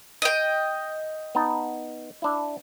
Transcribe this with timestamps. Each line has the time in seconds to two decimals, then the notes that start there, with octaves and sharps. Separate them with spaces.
0.22 D#5 G5
1.35 B3 D#4 A5
2.22 D4 E4